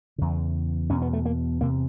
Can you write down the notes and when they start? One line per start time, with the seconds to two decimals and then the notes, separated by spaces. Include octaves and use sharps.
0.18 E2 C#3
0.90 E2 B2 C#4
1.02 B3
1.13 A3
1.25 A#3
1.60 E2 C3 A#3